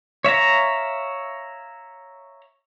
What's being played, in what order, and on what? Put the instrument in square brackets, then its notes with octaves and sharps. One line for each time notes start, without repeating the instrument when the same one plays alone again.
[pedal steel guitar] C#5 E5 F5 A#5